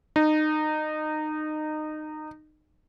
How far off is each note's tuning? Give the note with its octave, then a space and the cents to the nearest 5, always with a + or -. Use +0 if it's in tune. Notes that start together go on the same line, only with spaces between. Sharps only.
D#4 -20